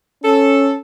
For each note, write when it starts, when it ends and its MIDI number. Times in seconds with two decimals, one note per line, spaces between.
0.24 0.78 61
0.24 0.73 69